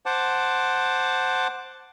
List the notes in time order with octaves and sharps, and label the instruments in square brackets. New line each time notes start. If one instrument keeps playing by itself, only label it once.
[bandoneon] C5 F#5 A5 D6